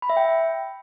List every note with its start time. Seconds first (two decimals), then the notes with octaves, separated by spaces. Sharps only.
0.02 B5
0.10 E5
0.17 G5